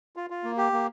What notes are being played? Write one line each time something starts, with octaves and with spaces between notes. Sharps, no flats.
F4
F4
A#3
G4
A#3